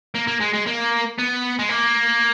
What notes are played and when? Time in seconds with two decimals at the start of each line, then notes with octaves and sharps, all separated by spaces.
0.15 A#3
0.27 A#3
0.41 G#3
0.53 G#3
0.66 A#3
1.18 B3
1.59 G#3
1.69 A#3